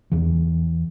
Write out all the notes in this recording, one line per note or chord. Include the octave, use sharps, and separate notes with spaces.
E2 E3